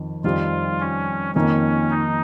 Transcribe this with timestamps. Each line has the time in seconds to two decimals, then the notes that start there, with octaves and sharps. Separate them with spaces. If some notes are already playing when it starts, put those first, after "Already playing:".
Already playing: F2 D#3
0.24 F2 D#3 G3 C4 F4 G4
0.80 C#4
1.35 F2 D#3 A#3 C#4
1.90 D#4